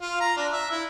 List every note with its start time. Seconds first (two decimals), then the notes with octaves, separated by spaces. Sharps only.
0.01 F4
0.20 A#5
0.37 D4
0.53 E5
0.71 E4